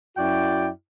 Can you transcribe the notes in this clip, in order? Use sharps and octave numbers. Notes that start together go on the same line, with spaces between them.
F#2 E4 F#4 D5 G5